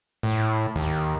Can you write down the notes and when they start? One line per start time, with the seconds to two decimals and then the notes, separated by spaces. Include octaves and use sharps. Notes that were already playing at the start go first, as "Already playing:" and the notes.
0.23 A2
0.76 D#2